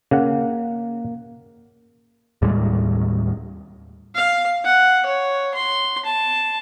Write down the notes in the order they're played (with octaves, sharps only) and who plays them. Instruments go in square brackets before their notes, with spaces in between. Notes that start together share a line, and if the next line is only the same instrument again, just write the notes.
[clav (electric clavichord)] C#3 F#5 [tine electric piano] A#3
[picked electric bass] D#2 A2 G3 G#3
[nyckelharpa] F5
F#5
C#5
C6
A5